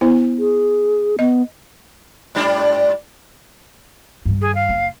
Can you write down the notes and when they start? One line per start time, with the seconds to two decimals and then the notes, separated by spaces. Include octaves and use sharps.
0.01 B3 E4 C5
0.39 G#4
1.19 B3 D#5
2.35 G#2 G3 D4
4.26 G2 D#3
4.41 G#4
4.54 F5
4.69 F#1